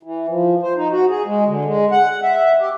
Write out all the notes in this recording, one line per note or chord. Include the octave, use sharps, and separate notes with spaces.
E3
F3
C5
D#4
F#4
G#4
G#3
D3
G#3
F#5
E5
G4